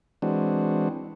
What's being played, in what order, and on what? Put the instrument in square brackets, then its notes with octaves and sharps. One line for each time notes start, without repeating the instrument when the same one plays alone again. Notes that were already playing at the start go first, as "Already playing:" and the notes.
[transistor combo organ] E3 G#3 C4 D4 F#4